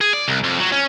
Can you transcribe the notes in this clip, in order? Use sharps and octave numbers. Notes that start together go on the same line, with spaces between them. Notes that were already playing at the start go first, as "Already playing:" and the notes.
G#4
D5
C2
F2
F#3
C#4